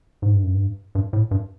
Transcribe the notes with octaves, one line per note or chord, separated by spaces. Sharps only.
G#2
G2
F#2
G2
G2
A2
G2